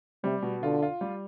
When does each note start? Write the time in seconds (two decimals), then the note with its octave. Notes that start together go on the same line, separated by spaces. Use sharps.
0.23 C3 G3
0.43 B2
0.63 D3 F4
0.83 F4
1.01 G3